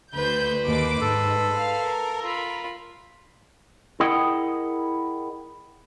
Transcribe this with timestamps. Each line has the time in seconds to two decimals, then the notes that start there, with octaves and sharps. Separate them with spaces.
0.15 D2 B4 C5 G6
0.66 D#2 D6
1.01 G#2 A4
1.58 F5
1.89 A#4
2.22 F4 B5
4.00 E4 G#4 A#4 D#5 F#5 G5